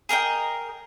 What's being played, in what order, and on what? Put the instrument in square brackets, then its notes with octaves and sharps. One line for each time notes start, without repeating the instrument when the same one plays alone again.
[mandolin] G#4 A#4 D#5 G5